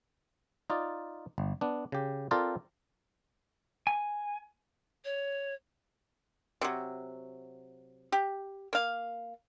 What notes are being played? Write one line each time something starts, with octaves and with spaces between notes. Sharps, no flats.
D#4 F4 D5
G1
B3 D4
C#3 G4
C4 F4 A4 A#4 C5 D5
G#5
C#5
C3 F#3
G4
A#3 F5